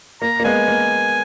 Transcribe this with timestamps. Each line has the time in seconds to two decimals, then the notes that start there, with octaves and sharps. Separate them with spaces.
0.22 A#3 A#5
0.40 A#3
0.44 G#3 B3 G#5
0.68 A#3